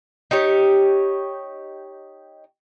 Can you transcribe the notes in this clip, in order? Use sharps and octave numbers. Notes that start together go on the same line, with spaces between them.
D#4 G4 C#5